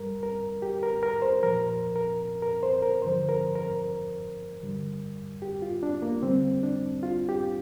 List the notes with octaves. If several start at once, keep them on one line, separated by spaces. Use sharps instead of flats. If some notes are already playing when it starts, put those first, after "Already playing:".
Already playing: G2 G3 A#4
A#4
G4
A#4
A#4
C5
A#2 F3 A#4
A#4
A#4
C5
A#4
G2 D3 F3 C5
A#4
A#4
G2 D3 G3
G4
F4
D4
A#3
F2 D3 G3 C4
D4
F4
G4